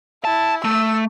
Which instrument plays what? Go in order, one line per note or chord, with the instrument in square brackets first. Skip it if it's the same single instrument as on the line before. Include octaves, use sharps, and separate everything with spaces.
[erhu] E4 [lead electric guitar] A5
[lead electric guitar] A3 [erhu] E6